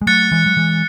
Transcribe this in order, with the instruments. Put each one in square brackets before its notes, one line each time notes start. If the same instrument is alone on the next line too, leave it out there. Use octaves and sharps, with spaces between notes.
[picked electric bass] G#3
[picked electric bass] F#3 A3 [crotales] F#6 A6 C#7
[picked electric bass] E3 G#3
F#3
E3 G#3